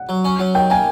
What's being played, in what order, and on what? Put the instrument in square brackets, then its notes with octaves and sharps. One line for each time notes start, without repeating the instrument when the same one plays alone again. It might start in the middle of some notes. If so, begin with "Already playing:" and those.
Already playing: [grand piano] F#5
[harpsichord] F#3
C#4
F#3
[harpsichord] D#3 [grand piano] G5
[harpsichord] A#3 [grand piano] G#5